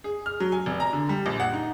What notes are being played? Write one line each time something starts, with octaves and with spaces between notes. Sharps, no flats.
G#4
F6
F#3
G#5
F1
A#5
D3
G3
A#1
F#5
D#4